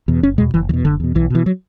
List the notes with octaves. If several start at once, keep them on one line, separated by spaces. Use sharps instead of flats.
E2 B2
F#1 C#4
E2 B2 G#3
F#1 E3
E2 B2 E3
F#1 D3
E2 B2
B1 E3
B2 E3
F#3